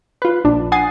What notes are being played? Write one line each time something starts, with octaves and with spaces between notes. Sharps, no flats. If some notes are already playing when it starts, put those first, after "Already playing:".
F4 B4
A#1 D4
F#5 G#5 D#6 A6 C7